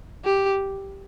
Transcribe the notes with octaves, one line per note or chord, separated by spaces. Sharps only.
G4